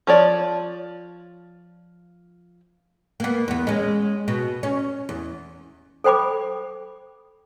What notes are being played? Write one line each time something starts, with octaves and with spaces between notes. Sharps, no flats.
F3 C#5 D5
A#3 B3
E2 B3
G#3 C#4
B2
C#4
E2
A4 C5 G5 B5 D6